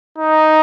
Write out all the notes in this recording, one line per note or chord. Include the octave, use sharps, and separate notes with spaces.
D#4